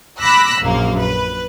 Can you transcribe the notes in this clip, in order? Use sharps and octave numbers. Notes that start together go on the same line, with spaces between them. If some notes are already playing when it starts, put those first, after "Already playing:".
B5 D6 E6 F#6 A#6 B6
A#1 F#2 A#3
B4